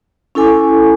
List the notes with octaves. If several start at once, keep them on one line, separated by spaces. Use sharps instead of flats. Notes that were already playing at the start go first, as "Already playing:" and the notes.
C#4 E4 A4 G#5 D6